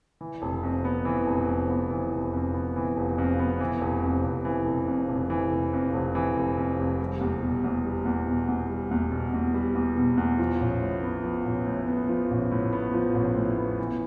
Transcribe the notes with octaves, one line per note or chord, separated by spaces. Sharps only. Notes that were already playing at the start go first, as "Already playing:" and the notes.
E3
F1
F2
B3
E3
F1
F2
B3
E3
F1
F2
B3
E3
F1
F2
B3
E3
F1
F2
F1
E3
F1
F2
F1
E3
F1
F2
F1
E3
F1
F2
F1
G3
E2
B2
E2
G3
E2
B2
E2
G3
E2
B2
E2
G3
E2
B2
E2
F3
A1
A2
B3
F3
A1
A2
B3
F3
A1
A2
B3
F3
A1
A2
B3
E3